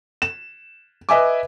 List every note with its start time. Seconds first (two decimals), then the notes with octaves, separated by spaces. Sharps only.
0.22 E7
1.09 B4 D#5 E5 G#5 D6